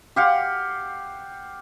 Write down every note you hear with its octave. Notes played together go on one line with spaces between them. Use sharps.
G4 F5 F#5